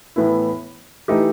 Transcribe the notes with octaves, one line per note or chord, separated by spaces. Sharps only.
A2 E3 B3 E4
E3 A3 D#4 G4